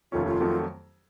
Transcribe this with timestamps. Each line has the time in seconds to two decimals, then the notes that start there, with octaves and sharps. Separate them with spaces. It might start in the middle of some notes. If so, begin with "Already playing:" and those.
0.12 F1 D#2 D#3 A3 C#4 F4
0.26 F4
0.40 F2 D#3 F#3 A3